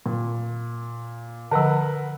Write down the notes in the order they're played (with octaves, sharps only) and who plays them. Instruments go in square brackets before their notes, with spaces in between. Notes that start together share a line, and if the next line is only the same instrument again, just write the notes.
[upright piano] A#2
[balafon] D3 F3 [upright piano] A#4 B4 F#5